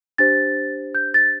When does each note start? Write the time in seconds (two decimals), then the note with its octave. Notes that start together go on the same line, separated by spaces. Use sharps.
0.18 D4 G4 C5 A6
0.95 G6
1.14 A6